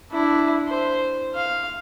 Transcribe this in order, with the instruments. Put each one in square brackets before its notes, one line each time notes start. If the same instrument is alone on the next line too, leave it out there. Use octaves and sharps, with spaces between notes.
[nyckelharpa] D4 E4
C5
F5